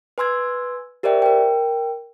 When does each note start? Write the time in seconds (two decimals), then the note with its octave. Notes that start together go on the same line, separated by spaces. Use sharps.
0.18 B4 G#5 C6 E6 G#6
1.03 G4 A#4 C5 D5 E5 G5
1.22 A#4 G5